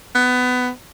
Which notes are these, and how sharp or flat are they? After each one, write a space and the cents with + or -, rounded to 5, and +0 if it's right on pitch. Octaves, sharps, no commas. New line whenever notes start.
B3 +20